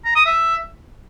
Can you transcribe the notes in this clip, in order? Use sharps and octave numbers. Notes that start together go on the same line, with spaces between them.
A#5
D#6
E5